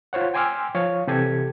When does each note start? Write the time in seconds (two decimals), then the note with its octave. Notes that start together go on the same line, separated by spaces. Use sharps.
0.13 F4 C5 C#5 F#5
0.34 G5 G#5 C6 D6 E6 F6
0.75 F3 C#5 F5
1.07 C3 E3 G4 A4 G#6